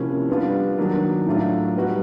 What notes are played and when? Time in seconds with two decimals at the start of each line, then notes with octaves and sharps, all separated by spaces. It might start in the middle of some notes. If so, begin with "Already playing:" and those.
Already playing: C3 F3 A#3 C#4 E4
0.29 G3 B3 D4 F4
0.78 D#3 F#3 A#3 D4
1.26 A2 F#3 A3 D4 F4
1.76 G3 B3 D#4 F#4